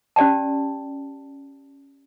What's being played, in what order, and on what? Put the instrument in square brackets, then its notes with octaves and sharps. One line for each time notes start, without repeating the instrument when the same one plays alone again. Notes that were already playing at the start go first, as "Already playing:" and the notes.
[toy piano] C#4 G4 D5 G5 A5